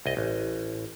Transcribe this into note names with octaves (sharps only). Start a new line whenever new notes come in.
C2 D#5
A1